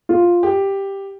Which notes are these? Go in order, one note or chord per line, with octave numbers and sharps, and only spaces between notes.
F4
G4